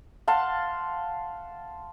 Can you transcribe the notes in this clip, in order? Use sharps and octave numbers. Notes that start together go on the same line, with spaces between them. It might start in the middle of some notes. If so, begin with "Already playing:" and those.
F5 F#5 A5 C6